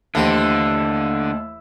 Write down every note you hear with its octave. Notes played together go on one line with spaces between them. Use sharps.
D#2 D3 E3 A3 G4 C5 D#5